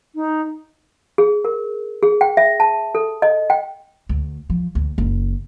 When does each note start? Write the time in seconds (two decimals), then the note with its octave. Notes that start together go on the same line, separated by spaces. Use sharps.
0.15 D#4
1.18 G#4
1.45 A#4
2.03 G#4
2.21 G5
2.37 E5
2.60 A5
2.95 A4
3.22 D#5
3.50 G5
4.09 D2
4.50 F3
4.75 D2
4.98 F#1